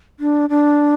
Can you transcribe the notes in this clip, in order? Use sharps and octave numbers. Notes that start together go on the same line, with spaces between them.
D4
D4